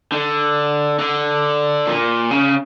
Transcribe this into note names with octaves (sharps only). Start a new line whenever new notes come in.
D3
D3
A#2
C#3